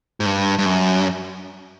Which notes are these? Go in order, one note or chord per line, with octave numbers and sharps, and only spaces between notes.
G#2
G2
G2
F#2